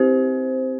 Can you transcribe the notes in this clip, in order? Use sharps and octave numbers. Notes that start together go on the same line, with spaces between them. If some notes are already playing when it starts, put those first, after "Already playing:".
Already playing: C4 G4 C5